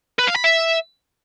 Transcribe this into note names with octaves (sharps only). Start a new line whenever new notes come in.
B4
F5
B5
E5